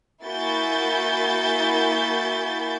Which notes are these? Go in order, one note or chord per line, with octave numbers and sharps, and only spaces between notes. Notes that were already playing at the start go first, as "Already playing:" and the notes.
A#3 E4 F#4 G#5 G6 A6